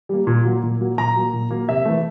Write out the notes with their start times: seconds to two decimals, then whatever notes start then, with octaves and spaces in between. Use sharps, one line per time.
0.09 G3 A#3
0.27 A#2
0.45 F#3 A#3
0.63 A#2
0.81 F#3 A#3
0.98 A#2 A#5
1.16 F#3 A#3
1.33 A#2
1.51 F#3 A#3
1.68 C3 E5
1.85 E3 A3